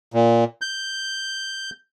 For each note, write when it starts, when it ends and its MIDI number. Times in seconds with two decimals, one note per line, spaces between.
0.14 0.44 46
0.61 1.70 91